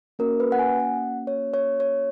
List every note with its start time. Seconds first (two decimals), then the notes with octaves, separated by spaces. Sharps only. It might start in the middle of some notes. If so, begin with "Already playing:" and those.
0.19 A#3 C#4 F#4 A#4
0.40 B4
0.52 F#5
0.59 G#5
0.80 F#5
1.27 C#5
1.54 C#5
1.80 C#5